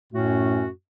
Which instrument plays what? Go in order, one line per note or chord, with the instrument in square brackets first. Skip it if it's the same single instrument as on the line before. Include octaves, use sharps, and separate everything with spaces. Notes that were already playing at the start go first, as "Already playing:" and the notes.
[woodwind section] F#2 A2 A3 C#4 F#4